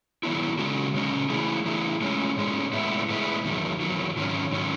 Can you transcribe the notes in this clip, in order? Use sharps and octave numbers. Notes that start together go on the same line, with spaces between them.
D#3 F#3 B3 E4
C#3 G#3 C#4 F#4
C#3 G#3 C#4 F#4
E3 A3 E4 G#4
E3 A3 E4 G#4
A2 G#3 C#4
A2 G#3 C#4
A2 G#3 B3 E4
A2 G#3 B3 E4
E2 D#3 F#3
E2 D#3 F#3
G#2 D#3 F#3 C#4
G#2 D#3 F#3 C#4